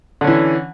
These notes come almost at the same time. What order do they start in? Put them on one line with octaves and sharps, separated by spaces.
D3 C#4 E3